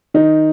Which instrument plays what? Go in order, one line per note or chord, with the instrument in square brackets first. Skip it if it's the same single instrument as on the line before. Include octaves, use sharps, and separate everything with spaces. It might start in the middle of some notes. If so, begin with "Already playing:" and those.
[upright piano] D#3 D#4